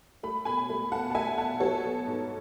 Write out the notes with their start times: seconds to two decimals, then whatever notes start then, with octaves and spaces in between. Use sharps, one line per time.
0.23 A3 B5
0.45 B2 G#5 B5
0.70 A3
0.92 B2 F#5 A5
1.10 A5
1.14 A3 E5 G#5
1.38 B2 F#5 A5
1.60 F#3 A4 C#5
1.84 B3
2.07 G#2